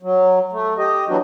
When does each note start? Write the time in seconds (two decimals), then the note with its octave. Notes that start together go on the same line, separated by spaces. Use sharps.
0.03 F#3
0.53 A3
0.78 G4 D#5
1.09 E3 F#3 B3 D4 F#4